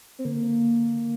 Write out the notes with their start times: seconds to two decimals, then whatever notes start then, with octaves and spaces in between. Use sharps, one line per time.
0.19 C4
0.25 D3 A#3